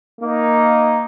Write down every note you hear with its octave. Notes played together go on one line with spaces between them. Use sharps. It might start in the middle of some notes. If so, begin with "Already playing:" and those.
A#3 D#4